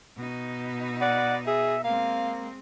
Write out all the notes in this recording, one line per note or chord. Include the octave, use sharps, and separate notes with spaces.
B2 D#4
D5 F#5
G#4 E5
G#3 A#3 C4 F5